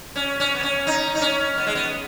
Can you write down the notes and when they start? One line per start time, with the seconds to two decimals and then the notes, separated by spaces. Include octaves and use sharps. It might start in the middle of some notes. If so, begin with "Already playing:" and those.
0.16 C#4
0.40 C#4
0.55 B3
0.63 C#4
0.87 D#4
1.15 D#4
1.21 C#4
1.58 B3
1.67 G#3
1.75 B3